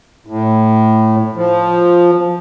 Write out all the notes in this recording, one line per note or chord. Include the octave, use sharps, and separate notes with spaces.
A2
F3